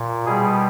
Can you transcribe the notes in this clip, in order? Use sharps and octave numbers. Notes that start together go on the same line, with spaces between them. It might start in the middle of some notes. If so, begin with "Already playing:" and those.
Already playing: A#2
B2 G3 G#4